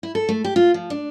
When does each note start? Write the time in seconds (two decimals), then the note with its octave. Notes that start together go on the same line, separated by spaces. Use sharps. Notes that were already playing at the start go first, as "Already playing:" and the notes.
0.03 E4
0.15 A4
0.29 A3
0.44 G4
0.56 F4
0.74 F3
0.90 D4